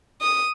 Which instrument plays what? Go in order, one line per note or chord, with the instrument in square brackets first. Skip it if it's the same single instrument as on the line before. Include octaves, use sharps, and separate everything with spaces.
[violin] D#6